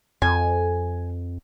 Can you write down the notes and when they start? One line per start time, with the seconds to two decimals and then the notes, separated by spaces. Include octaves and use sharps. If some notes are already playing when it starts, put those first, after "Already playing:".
0.22 F2 G#5